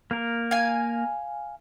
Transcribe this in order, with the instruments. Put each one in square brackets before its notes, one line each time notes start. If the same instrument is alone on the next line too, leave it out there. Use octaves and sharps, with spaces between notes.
[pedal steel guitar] A#3 A#4
[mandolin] F5 G#5